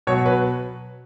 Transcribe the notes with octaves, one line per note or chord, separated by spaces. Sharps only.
B2 F#3 C#5
B4